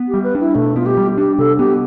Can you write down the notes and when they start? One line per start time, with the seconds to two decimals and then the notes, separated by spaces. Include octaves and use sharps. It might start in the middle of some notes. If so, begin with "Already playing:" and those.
Already playing: B3
0.08 G4
0.14 G3
0.24 B4
0.35 D4
0.40 E4
0.55 B2 A3
0.76 B3 F4
0.86 G4
0.97 G3
1.18 D4 G4
1.38 C3 A4
1.59 B3 G4